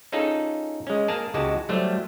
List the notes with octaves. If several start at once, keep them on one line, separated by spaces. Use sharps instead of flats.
C#4 D#4 F4 G#4 A4
G#3 C#4
A#3 G#4 A#4 A5
C#2 G#3 F#4 G4 A5
F#3 G3 A3 C5